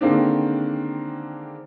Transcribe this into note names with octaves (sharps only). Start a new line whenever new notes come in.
D3 D#3 G#3 A#3 C4 D4